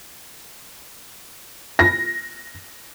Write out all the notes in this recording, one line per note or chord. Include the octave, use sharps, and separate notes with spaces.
A#6